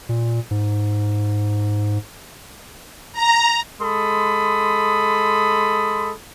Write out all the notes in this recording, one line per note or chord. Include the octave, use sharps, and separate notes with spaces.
A#2
G#2
A#5
G#3 A4 B5 C6 D#6